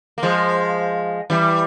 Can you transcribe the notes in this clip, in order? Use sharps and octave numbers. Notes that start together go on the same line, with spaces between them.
A#3
F3 G#3
E3 G3